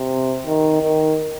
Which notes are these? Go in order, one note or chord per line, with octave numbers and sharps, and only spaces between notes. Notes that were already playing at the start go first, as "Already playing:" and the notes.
Already playing: C3
D#3
D#3